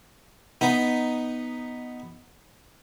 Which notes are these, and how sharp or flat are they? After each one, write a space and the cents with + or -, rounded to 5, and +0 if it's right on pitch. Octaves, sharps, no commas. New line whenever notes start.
B3 +0 D#4 +0